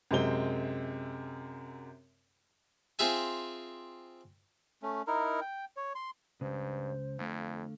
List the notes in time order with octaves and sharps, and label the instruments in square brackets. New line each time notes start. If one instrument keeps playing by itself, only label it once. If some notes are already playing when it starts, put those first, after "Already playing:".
[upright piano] F#2 C3 G#3 C4 G7
[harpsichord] C4 F4 G#4 E5 G#5
[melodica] A3 C#4
D#4 E4 A#4
G5
C#5
C6
[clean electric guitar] C#2 C#3 [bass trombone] G2 [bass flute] C5
[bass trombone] F2 [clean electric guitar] D3 A3 F5